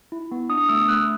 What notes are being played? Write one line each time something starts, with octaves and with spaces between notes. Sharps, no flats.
E4
B3
D4 D#6
A3 E6
A3 F#6